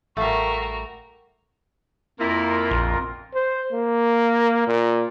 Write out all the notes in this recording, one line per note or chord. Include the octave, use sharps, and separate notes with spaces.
A1 G3 A3 F#4 A#4 E5 F5 C#6
F2 A#3 E4 F4 A#4
A#1
C5
A#3
A#2